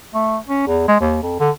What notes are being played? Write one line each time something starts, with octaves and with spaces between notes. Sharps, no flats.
A3
C#4
E2
G#3
D#2
F2
D3